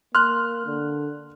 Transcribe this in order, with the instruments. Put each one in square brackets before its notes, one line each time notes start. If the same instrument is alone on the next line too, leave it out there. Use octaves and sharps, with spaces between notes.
[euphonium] A#3 [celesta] C6 [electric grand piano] F6 F#6
[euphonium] D3